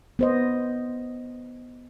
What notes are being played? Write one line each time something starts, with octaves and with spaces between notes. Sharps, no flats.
B3 C5 D#5